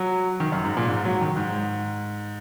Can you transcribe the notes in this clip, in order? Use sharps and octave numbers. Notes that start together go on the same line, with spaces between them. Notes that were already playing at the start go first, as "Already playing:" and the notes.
Already playing: F#3
D#3
F#2
G#2
A#2
G#2
F#3
D#3
G#2